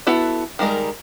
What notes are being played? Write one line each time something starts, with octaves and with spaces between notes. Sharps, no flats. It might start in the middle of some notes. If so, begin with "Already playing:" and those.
B3 E4 F#4 A4
D#3 G3 G#3 A#4